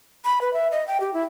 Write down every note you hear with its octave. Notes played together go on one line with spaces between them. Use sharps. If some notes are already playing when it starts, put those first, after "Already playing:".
B5
B4
E5
D#5
G5
G4
E4